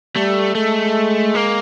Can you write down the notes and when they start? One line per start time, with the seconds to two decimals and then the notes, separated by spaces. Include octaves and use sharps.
0.16 G3 A3
0.55 G#3 A3
1.35 A#3